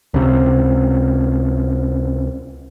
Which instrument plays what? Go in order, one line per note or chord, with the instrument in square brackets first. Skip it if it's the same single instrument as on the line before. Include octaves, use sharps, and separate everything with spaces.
[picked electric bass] C#2 C3